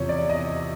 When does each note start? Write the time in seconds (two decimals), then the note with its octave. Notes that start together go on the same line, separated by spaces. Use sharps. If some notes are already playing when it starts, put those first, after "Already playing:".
Already playing: E2 C3 F3 C#5
0.09 D5
0.29 D#5